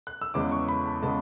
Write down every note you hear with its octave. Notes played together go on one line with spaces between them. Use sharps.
F#6
E6
E2 C#3 G#3 B3 D6
C#6
B5
A5
C#3 G#3 B3 A5